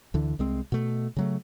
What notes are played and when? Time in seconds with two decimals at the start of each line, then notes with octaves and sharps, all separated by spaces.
0.14 D2 D3 E3
0.39 C2 G#3 C4
0.72 B2 A3
1.16 C#3 F#3 A3